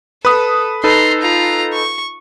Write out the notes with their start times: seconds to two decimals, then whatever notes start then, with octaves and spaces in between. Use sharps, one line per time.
0.25 A4 B4 D#6
0.84 D#4 A4 B4 A#5 C6
1.21 F4 A#5
1.73 C#6